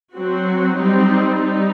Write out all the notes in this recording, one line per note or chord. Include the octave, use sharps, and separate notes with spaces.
F#3 C4 F#4
G3 C4 D#4
G3 D#4